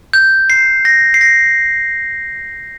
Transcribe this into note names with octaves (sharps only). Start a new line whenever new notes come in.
G6
C7
A#6
C7
A#6